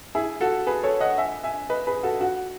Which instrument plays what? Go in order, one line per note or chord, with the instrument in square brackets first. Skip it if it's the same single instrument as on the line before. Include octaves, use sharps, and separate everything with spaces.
[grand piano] E4 G#4
F#4 A4
G#4 B4
A4 C#5
D#5 F#5
E5 G#5
E5 G#5
B4 D#5
G#4 B4
F#4 A4
F#4